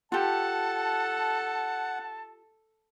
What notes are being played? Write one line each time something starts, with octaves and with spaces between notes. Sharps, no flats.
F4 G4 A4 F#5 A5